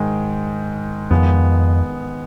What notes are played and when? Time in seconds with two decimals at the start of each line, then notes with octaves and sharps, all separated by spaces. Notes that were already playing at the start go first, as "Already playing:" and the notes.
Already playing: G#2 D#3 G#3
1.11 F2 D#3 G#3 B3